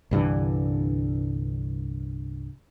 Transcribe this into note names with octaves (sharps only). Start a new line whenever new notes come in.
C2 G2 D3 E3